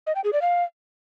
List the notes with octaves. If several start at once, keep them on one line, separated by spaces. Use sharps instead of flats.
D#5
G5
G#4
D5
F5